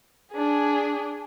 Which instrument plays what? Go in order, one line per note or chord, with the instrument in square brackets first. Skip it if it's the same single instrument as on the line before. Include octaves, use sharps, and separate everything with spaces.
[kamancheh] D4 G#4